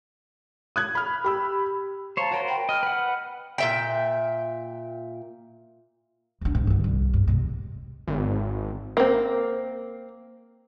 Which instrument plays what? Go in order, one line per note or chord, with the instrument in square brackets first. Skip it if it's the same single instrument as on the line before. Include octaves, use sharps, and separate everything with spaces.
[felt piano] D#6 F#6 G#6
B5 F6
G4 B5 E6
[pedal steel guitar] C5 C#5 [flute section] F5 A5 A#5 [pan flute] C6
[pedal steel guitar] F#4 A#4 C5 [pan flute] C#5
[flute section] G5 [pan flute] B5
[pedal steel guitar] D#5 [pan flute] F6
[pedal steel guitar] B4 F#5
[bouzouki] A#2 E5 G5
[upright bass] D#2 D4
G#2
G2 D3
C2
G2
C3 G#3
[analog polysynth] G#1
[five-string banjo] A#3 C4